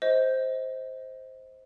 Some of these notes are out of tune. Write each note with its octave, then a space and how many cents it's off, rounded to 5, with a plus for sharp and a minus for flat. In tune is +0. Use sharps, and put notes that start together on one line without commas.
C5 +0 D#5 +30